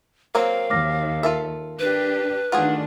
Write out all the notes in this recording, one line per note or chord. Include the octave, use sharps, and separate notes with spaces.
F#3 A#3 C4 A#4 C5 F5
D#2 D6 F6 A#6
F4 A4 A#4 E5
D4 G4 B4
D#3 A3 D4 F4 F#4 G#4 F#5